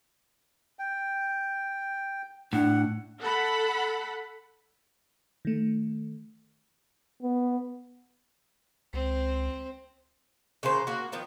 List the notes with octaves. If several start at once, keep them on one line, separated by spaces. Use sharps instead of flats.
G5
A2 D4 F#5
A4 F#5 B5
D#3 A3
B3
C#2 C4
C#3 E3 A#3 C5
A#3 F#4
D#3 F3 B3